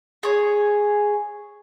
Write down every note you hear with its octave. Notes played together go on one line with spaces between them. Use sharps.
G#4 C#5